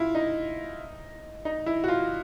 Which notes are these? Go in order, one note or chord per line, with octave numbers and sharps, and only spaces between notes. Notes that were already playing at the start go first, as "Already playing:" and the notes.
Already playing: E4 F4
D#4
D#4
E4
F#4
F4